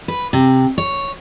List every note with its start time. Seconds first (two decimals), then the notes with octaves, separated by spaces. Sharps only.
0.08 B4
0.33 C3
0.78 C#5